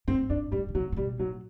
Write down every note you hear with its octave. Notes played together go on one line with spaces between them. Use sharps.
G2 C4
G2 D4
A2 G3
D3
C3 F#3
A2
B2 G3
A2 F#3